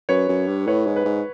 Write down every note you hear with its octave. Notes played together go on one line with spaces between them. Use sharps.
F#2 B4 C#5
F#2
G2
A2 B4 C#5
G#2
B4
G#2